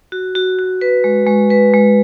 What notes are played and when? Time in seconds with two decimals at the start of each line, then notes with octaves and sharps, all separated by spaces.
0.12 F#4
0.35 F#4
0.59 F#4
0.81 B4
1.04 G#3
1.27 G#3
1.50 B4
1.74 G#3